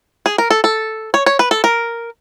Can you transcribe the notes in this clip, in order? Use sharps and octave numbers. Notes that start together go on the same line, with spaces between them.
G#4
A#4
A4
A4
C#5
C#5
B4
A4
A#4